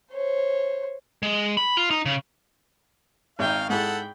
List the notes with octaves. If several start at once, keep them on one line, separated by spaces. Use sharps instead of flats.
C5 C#5
G#3
B5
F4
D#4
C#3
G#1 D#4 E5 F5 G5
G#2 E4 G#4 A4 F#5 G5 B5